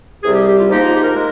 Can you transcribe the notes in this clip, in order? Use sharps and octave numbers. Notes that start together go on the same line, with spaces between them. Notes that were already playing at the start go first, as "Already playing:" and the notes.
C2 C3 G3 G#4
G4
G4
F4
G#2 F3 A#3 D#4 G4
F4
G4
A#4
G#3